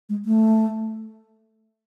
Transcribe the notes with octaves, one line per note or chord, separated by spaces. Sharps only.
G#3
A3